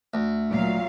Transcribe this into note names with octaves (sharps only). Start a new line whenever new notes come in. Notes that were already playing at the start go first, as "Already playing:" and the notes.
D2
A#2 F#3 F5